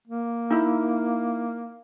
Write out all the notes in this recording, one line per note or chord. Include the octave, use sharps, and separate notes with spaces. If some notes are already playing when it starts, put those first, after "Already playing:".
A#3
D#4 E4